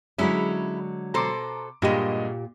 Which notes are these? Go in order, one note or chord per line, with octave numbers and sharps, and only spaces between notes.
D3 F#3 G#3 C#4 E4
B2 A4 C5 A#5 C6 D6
G2 A#2 F#3 G#3 A#3 G4 D#5